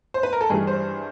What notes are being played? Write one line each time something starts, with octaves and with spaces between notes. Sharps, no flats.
C5
B4
A#4
A4
G2 E3 G3 G#4
C5